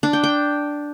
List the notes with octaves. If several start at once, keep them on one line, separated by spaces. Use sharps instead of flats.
D4
G5
G5